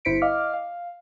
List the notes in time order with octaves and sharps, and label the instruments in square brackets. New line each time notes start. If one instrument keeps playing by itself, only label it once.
[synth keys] G1 E4 C5 B6 C#7 D7
D#5 F5 D6 F6
F5